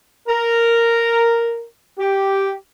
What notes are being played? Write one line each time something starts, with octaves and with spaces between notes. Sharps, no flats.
A#4
G4